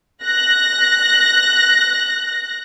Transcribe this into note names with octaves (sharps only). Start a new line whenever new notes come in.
F#6 A#6